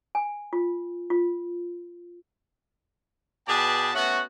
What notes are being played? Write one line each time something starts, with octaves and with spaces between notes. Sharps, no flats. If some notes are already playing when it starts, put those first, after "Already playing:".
G#5
F4
F4
B2 G#4 B4 D5 G5 A5
A3 B3 C#4 F#4